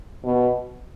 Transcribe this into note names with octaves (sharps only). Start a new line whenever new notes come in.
B2